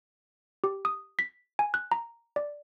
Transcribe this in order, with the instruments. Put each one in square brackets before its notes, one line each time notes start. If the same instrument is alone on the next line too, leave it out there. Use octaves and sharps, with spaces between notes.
[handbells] G4
D#6
B6
G#5
F#6
A#5
D5